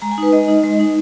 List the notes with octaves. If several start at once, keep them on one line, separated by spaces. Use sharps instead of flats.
G#3 A#5
G#5
D#4 B4
G#3 D#5
D#4
G#3
D#4